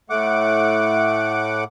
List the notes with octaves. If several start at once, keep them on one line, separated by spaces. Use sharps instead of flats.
A2 A3 F#5 D6